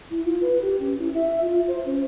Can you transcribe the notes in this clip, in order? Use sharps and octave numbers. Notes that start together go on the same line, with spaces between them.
E4
F4
B4
G4
C#4
E4
E5
F4
C5
C#4